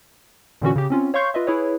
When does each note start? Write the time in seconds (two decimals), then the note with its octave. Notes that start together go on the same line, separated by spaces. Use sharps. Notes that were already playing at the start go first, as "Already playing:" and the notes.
0.62 A#2 D3 E3 C#4 F#4
0.76 C#3 G4
0.90 C4 C#4 F4
1.14 C#5 F5 C6 C#6 G6 C7
1.34 F4 B4 D#5 E5
1.47 E4 G#4 B4 C#5